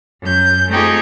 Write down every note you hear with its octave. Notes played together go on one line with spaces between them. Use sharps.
F#2 G6
A3 C4 D#4 F4 G4 G#4